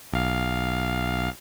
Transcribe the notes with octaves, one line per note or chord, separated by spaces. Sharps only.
B1 F5